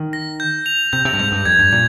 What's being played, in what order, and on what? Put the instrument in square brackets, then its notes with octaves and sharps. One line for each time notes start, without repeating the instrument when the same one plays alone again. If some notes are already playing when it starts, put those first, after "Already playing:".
Already playing: [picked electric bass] D#3
[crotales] A#6
G6
F7
[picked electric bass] C3 [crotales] G6
[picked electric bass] C3
G2
[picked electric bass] G#2 [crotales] G6
[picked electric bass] G2
[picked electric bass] F2 [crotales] G#6
[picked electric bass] G2
[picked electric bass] A#2 [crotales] G#6